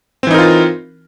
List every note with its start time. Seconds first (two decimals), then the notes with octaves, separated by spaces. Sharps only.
0.23 C4
0.27 E3
0.31 D#4
0.34 A#4
0.38 F4